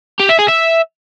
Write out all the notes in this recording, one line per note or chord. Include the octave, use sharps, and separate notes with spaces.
G4
E5
G#4
E5